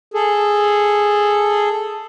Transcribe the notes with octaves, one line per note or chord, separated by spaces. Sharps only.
G#4 A4